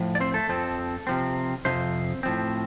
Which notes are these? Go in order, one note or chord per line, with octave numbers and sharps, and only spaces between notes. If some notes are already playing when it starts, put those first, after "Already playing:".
Already playing: A2 F3
D5
C4 C5
A3 A4
F2 F3 C4
C3 F3 C4
F2 C3 F3 C4 C5
A2 F3 C4